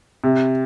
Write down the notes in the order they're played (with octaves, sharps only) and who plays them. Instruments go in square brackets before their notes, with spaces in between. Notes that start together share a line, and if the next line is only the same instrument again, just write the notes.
[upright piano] C3